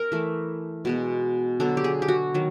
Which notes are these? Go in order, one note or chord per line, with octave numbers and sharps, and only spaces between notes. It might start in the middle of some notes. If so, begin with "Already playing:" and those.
Already playing: A#4
E3 A3
B2 G#3 B3
D3 F#3 B3 A4
G4
G#4
G4
F#4
D#3 F#3